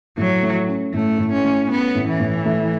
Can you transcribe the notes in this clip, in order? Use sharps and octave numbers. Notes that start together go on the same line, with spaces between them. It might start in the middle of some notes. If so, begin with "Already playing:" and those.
A2 F#3
A3
C#4
A2 A3
A2
C#4
A3
B3 C#4
A2
E3
A2
A3